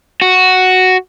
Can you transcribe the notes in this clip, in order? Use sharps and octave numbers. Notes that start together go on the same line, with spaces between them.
F#4